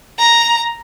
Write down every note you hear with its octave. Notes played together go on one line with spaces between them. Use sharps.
A#5